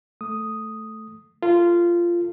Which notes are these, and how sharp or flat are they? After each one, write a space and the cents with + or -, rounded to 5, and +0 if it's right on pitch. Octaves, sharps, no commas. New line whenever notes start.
A3 +0 D#6 +0
F4 -15 A4 +30